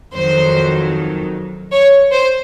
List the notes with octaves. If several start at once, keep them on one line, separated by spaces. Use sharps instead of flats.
F2 D#3 F#3 C5
C#5
C5